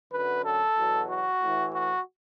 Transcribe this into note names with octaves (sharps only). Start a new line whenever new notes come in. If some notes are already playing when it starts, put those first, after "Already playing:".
F#2 D3 F#3 B4
A4
E2 B2 F#3
F#4
A2 E3
F#4